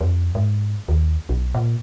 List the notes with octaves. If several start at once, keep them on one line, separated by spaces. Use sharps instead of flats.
F2
G#2
D#2
B1
A#2